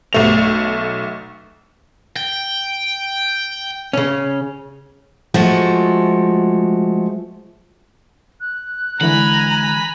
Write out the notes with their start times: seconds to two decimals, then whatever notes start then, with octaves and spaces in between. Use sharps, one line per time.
0.13 B1 A3 F7
2.16 G5
3.93 C#3 C#4
5.34 F3 G#3 A3 F#4
8.40 F#6
9.01 D3 E3 G#3 G#5 A#5 B5